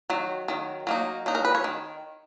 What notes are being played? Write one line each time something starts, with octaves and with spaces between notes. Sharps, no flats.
D#3 F#3
D#3 F#3
F#3 A#3 D#4
F#3 A#3 D#4
A#4
B4
C#5
D#3